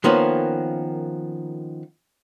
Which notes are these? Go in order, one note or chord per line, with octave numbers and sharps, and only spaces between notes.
D#3 F3 A#3 B3 C#4